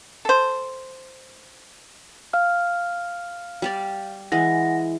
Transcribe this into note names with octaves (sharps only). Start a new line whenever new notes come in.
A4 C5
F5 F6
G3 G4 D5
E3 G#3 F#5 A#6